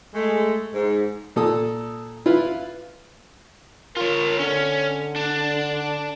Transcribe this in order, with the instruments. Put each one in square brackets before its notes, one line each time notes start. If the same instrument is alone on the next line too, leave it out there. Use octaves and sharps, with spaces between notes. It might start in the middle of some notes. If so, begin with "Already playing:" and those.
[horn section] G#3 A3
G#2
[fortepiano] A#2 A4 D#6
E4 F4 B4 F5
[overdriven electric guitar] F4 C#5 [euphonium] A#4
[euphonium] D3 [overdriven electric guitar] C#4
[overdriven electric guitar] D4